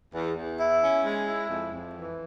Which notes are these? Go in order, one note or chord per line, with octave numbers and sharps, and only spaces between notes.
E2
E2
E4
C#4
G#3
E4
F2
F2
E3